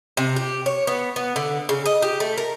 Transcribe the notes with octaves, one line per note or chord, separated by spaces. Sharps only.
C3
G4
C#5
B3
B3
D3
C#3
D#5
G4
A3
A#4